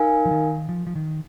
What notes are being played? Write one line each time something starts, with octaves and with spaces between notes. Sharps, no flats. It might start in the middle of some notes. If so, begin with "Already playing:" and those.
Already playing: D#4 A#4 F5 G#5
F3
D#3
F3
F3
D#3